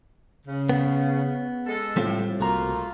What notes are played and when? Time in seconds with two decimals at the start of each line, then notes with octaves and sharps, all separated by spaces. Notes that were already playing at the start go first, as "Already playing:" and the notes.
0.47 C#3
0.70 B3
1.66 G#3 A4
1.97 A2 G3 C4 F4
2.39 C2 A3 A#3 F4 F#4 A#5